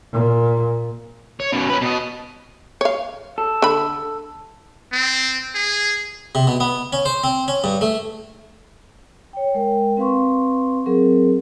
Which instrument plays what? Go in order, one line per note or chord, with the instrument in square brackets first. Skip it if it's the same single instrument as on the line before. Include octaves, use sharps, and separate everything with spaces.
[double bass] A#2
[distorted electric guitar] C#5
F#2 B2
C#4 B4
B2 D#5
[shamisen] C#5 F5
[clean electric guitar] A4
[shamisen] D3 B5
[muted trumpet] C4
G#4
[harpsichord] C3
B2
B3
C#4
C5
C4
C#4
G2
A3
[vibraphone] C#5 G5
G#3 A#4 G5
C4 B4 F5 C6 C#6
F#3 C4 G#4 A#4